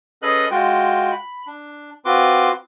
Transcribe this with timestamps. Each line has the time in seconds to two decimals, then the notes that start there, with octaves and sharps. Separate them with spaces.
0.22 C#4 G#4 A4 B4 D#5 F#6
0.51 G#3 F4 F#4 G5
1.12 B5
1.47 D4
2.05 C4 F4 F#4 B4 C6 D6